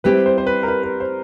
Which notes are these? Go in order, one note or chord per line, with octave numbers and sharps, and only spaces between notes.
G3 C4 E4 G4 B4
C5
C5
B4
A#4
B4
B4
C5